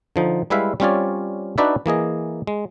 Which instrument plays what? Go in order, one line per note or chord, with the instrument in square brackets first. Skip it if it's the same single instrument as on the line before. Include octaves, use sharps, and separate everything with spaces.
[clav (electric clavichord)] D3 F3 D#4
G3 G#3 E4 B4 E5 F5
G3 C4 C#4 F4 C#5 D5
D4 D#4 F#4 B4 D5 E5
E3 A#3 G#4 D#5
G#3